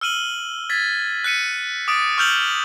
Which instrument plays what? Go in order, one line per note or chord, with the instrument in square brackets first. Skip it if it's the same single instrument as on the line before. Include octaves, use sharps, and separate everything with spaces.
[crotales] E6 F6 D#7 F#7 G7
G#6 A6 B6
F#6 B6 C#7 D#7
D6 D#6 A6 D7
C#6 E6 F6 G6 F7 F#7